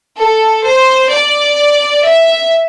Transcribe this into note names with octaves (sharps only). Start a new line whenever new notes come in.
A4
C5
D5
E5